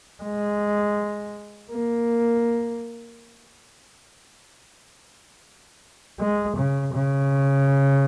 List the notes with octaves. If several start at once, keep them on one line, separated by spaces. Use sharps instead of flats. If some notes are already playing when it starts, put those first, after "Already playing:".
G#3
A#3
G#3
C#3
C#3